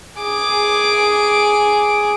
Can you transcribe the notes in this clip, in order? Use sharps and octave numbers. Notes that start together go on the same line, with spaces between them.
G#4 D6